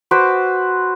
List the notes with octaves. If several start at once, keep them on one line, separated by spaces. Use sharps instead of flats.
F#4 B4 C5 D6